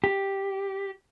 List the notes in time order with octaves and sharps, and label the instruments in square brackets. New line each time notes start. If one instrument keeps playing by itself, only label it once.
[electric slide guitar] G4